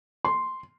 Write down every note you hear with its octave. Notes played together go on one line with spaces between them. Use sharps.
C6